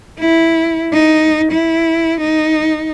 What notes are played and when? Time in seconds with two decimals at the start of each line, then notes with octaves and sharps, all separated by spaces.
0.19 E4
0.92 D#4
1.51 E4
2.20 D#4